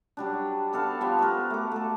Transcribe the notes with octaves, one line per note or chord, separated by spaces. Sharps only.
F#3 G3 D4
B3 A4 D5 F5
F3 G3 B3
B3 F#4 A#4
A3 D6
A3 A4